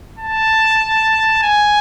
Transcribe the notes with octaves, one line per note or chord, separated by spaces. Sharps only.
A5
G#5